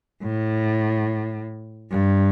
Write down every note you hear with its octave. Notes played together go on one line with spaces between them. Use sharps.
A2
G2